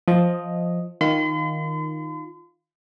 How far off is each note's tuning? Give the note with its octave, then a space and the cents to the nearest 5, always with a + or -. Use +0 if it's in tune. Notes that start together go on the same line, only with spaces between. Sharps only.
F3 +0 D#5 +0
D#3 +0 F4 +0 C6 -45